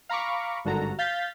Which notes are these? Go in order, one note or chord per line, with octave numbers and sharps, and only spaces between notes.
F5 A#5 B5 C#6 D6
G#1 G2 D3 F#4 A4 A#5
F5 G6 A6 B6